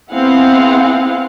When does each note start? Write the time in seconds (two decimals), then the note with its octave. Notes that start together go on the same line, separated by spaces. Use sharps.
0.12 B3 C4 E4 G#4 F5 F#5